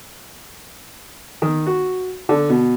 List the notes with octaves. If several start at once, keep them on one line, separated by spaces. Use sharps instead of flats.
D#3
F#4
D3
B2